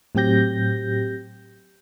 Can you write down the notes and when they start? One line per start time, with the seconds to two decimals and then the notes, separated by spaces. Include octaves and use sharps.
0.15 A2 F#3 C4 G4 G6 A#6